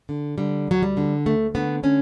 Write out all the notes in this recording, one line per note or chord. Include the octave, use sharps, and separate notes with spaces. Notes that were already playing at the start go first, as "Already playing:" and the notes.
D3
D3 G3
D2 F#3
G3
D3
D2 A3
D3 B3
D3 C#4